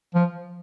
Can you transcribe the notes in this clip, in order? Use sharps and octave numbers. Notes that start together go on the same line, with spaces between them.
F3